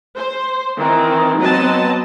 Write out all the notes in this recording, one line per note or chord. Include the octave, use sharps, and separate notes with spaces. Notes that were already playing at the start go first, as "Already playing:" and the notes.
C5
D#3 E3 C4
F#3 B3 C4 D#5 A5